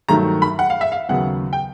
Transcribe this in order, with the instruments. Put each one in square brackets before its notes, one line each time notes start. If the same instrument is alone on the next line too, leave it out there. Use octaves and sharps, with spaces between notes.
[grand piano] G2 D#3 F#3 A3 A#5
B5
F#5
F5
E5
F5
D#2 C#3 F#3 B3 F#5
G5